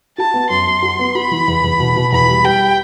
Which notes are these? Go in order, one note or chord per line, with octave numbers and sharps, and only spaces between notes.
F#4 A5
B3
F#2 C6
F#2
F#4
B3
F#4 B5
E3
E2
E2
B2
B2
E2 B5
G3
G3 G5